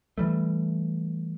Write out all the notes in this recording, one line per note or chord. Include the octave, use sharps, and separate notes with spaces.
E3 G3 A3